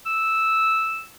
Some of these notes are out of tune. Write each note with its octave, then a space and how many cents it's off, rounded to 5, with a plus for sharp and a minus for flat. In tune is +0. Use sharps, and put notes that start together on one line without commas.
E6 -5